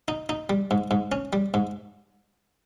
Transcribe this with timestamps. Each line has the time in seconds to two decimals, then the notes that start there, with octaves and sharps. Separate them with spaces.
0.08 D#4
0.29 D#4
0.50 G3
0.71 G#2
0.91 G#2
1.12 C#4
1.33 G3
1.54 G#2